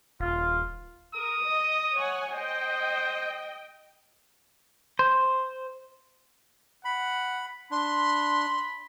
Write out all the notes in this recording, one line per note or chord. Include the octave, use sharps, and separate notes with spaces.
D#1 F4
A#4 D#6
D#5
C#5 F#5 G#5
C5 D#5 G5
C5
F#5 B5
D4 B5 C6